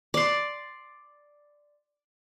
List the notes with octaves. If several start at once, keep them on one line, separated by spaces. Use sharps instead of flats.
D5 C6